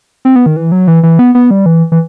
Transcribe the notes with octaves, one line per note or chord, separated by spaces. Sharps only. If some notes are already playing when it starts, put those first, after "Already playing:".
C4
B3
D#3
E3
F#3
E3
E3
B3
B3
G3
E3
E3